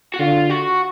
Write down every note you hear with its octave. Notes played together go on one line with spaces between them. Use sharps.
F#4
D3 F4
F#4